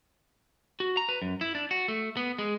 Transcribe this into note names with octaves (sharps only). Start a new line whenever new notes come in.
F#4
A#5
B4
F#2
E4
D4
F#4
A3
B3
G#3